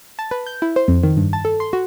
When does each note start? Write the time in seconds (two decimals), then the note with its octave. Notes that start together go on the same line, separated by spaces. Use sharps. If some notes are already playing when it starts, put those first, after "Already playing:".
0.19 A5
0.31 B4
0.47 G6
0.62 E4
0.76 C5
0.88 F2
1.03 D#3
1.17 G2
1.33 A5
1.45 A4
1.60 C6
1.73 F#4